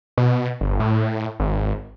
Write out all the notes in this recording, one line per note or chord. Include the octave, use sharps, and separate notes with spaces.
B2
G1
A2
G#1